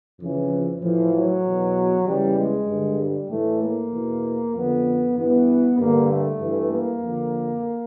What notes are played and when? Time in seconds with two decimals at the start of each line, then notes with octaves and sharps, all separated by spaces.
0.20 F2 C#3 E3
0.50 F3
0.81 A2 E3 F3
1.11 F#3
1.44 E2 B2
2.05 E2 C#3 E3 G3
2.36 G#3
2.68 G2 D3
2.99 G3
3.30 A2 E3 A3
3.60 A#3
3.92 E2 B2
4.53 F2 D3 B3
5.16 G2 E3 B3
5.78 G2 D3 A#3
6.09 A3
6.40 G2 E3
6.71 A#3
7.02 F2 D3